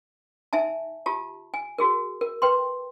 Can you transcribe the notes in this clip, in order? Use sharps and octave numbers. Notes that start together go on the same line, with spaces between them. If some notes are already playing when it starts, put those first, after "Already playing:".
D#4 E5 G#5 A5
F4 G4 A5
G#5
F#4 G#4 A#4
A#4
B4 G5 C6